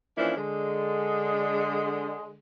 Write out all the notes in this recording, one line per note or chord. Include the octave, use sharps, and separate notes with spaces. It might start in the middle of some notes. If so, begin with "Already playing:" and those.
E3 F3 A#3 C#4 D4 E4
D3 G#3